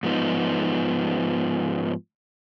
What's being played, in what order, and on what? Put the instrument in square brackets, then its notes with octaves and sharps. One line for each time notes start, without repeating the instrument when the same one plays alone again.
[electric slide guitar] G#2 F3 B3 D#4